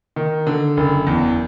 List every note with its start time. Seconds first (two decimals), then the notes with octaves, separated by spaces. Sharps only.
0.16 D#3
0.47 D3
0.77 F#1
1.07 E2